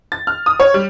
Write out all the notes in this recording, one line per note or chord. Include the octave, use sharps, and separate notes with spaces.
A6
F6
D#6
C#5
G3